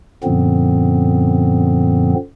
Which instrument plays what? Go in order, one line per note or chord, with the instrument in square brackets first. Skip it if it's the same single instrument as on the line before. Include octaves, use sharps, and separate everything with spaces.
[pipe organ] F#2 A#2 D3 F3 B3 C4